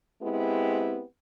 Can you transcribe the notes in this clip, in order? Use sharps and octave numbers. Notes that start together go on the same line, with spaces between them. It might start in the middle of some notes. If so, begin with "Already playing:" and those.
G#3 B3 C4 E4 G4